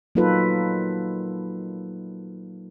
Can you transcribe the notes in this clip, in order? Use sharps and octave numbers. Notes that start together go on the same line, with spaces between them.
F#3 A#3 D#4 F4 A4 B4